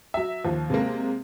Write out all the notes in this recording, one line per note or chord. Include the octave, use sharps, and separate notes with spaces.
F#3 E5
D#2 F3
C3 G#3 A#3